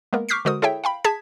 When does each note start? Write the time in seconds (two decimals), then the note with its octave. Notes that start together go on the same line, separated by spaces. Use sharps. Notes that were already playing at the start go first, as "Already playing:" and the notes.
0.13 G#3 A#3 B3 A#4
0.29 C#6 D6 F6 G6 B6 C7
0.45 D3 G#3 F#4 A#4 C5 D#6
0.62 E4 G#4 A4 C#5 E5 G5
0.84 F5 G5 B5
1.04 G#4 A5 G#6 B6